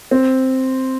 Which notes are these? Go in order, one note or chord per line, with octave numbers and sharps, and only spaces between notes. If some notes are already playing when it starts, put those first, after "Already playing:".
C4